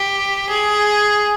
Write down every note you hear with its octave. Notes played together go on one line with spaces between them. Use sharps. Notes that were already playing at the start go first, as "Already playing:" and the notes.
Already playing: G4
G#4